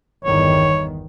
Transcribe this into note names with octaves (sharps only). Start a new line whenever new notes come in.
G1 E2 D#3 C#5